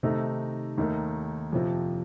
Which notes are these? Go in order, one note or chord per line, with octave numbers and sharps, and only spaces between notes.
C3 D#3 A3 D#4 A4
D#2 D#3 A3 D#4 A#4
F2 C3 F3